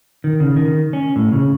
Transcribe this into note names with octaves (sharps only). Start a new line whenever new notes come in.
D#3
C#3
D#3
C#4
A2
C#3